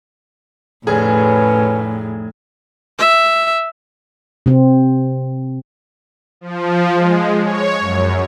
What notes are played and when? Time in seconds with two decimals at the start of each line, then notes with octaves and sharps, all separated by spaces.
0.87 F1 A2 C#4 G#4 B4
2.99 E5
4.46 C3 C4
6.41 F3
6.94 G#3
7.44 C#5
7.80 F#2